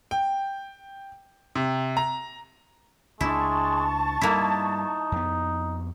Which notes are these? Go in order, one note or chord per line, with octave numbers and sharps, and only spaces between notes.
G5
C3
A#5
C#2 G#3 D4 E4 A5 C#6
G2 G3 A#3 D#4 E4
F2 B3